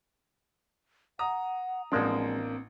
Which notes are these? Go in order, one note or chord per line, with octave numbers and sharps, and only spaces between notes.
F#5 A#5 D#6
A1 F3 G#3 A#3 C4 D4